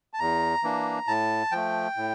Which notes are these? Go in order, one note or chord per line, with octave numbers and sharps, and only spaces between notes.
A5
E2 A#5
E3 A#3 D4
A2 A5
F3 A3 G5
A2